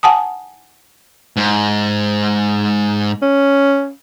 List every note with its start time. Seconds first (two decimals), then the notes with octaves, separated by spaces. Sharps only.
0.03 F#5 G#5 A5 D#6
1.37 G#2
3.22 C#4